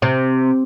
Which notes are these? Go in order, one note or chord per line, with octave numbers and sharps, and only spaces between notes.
C3